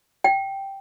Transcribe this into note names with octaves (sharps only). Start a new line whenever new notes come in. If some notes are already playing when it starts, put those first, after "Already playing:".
G5